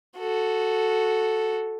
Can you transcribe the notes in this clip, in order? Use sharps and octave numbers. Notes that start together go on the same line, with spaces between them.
F#4 A4